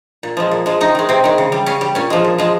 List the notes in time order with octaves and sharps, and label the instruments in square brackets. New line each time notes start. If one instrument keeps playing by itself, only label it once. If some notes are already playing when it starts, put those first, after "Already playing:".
[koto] A#2
F3 G#3
A#2
F3 G#3
C3 D#4
D#3 G#3
C3 C4
D#3 G#3
C#3
G3
C#3 C#4
G3
A#2 C#4
F3 G#3
A#2
F3 G#3